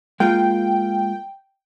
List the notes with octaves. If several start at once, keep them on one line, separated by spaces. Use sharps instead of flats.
G#3 A#3 F4 G5